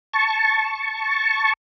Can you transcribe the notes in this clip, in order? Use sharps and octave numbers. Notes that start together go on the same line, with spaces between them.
A5 C#6